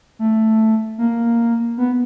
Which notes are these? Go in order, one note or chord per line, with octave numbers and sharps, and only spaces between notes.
A3
A#3
B3